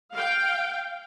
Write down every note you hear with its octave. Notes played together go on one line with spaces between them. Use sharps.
F5 G5